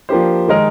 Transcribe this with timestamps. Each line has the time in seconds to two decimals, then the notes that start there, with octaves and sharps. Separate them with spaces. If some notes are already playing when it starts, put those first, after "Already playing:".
0.09 F3 A#3 D4 G4 C5
0.48 D#3 G#3 D#4 A#4